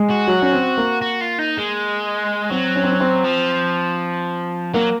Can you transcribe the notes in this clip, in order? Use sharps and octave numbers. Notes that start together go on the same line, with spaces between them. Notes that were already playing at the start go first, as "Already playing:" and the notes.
Already playing: G#3
F#4
F#3
C#4
C4
A#3
F#4
F4
D#4
G#3
F#3 C4
C#4
C4
C#4
C4
F3
F#3 A#3